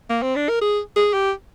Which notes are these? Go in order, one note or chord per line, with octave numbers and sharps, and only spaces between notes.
A#3
C4
D4
A#4
G#4
G#4
G4